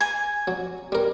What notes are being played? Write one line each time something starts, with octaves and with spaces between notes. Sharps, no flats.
G#5
F#3
G3 A#4